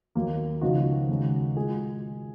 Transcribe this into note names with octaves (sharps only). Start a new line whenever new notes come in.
D#2 D#3 F#3 A#3
C#2 C#3 F3 A#3 D#4 F#4
D#2 C#3 G#3
A#2 G#3 F4 G#4